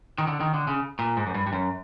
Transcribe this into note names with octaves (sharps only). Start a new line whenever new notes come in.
D#3
D3
D#3
D3
C#3
A#2
G#2
F#2
G2
G2
F#2